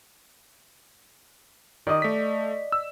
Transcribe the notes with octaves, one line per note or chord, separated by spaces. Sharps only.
D#3 D5 D#5 D#6
A3 B6
E6